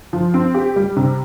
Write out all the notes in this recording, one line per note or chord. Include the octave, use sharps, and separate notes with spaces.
F3
C4
G4
G3
C3